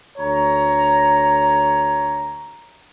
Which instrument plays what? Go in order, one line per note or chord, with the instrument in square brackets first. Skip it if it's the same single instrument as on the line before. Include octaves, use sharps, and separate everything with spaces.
[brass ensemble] D2 C#5 A#5